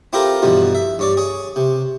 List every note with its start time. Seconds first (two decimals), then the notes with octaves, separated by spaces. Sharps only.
0.13 C4 E4 F4 G4 A4 A#4
0.42 G2 B2 E3 F3
0.75 E5
0.99 G2 C#5 D5
1.17 G#4 C#5
1.56 C3